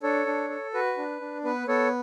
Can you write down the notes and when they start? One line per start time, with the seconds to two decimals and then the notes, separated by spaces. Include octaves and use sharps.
0.03 D4 A4 C#5
0.27 D4
0.50 A4
0.74 F#4 B4
0.98 D4
1.21 D4
1.44 B3 B4
1.68 B3 A4 C#5